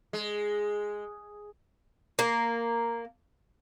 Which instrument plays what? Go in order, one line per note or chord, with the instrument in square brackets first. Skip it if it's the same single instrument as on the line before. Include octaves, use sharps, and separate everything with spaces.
[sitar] G#3
[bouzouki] A#3